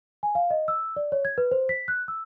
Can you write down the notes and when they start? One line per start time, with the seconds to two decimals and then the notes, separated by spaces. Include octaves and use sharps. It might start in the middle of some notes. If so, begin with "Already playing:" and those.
0.23 G#5
0.35 F5
0.51 D#5
0.68 E6
0.96 D5
1.12 C#5
1.25 G#6
1.38 B4
1.52 C5
1.69 B6
1.88 F#6
2.08 E6